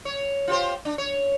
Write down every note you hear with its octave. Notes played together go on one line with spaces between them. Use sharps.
C#5
F4 G4 C5
D4
C#5